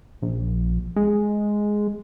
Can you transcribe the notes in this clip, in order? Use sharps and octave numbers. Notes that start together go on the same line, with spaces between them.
A#1
G#3